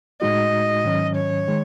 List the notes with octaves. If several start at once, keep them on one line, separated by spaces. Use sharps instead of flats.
A2 G#3 D#4 F#4 D#5
G#2 D#3 F#3 C#4
C#5
D#3 G#3